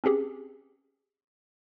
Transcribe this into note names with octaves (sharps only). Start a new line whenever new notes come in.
C4 C#4 G4 G#4